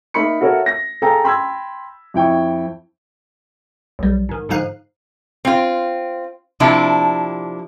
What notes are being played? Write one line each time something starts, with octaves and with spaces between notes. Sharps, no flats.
A#3 D#4 E5 B5 C#7
F#4 A4 A#4 C#5 E5 F5
A#6
G#4 A4 F5 G5 A#5
G5 B5 C6 E6 G#6
F2 E4 G5 C#6
B1 G3
G#2 D#3
G#2 D3 F3 D#4 F5 F#6
C4 F4
C3 F3 A#3 D4 E4